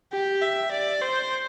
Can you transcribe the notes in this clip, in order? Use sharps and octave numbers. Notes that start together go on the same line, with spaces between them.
G4
E5
D5
C5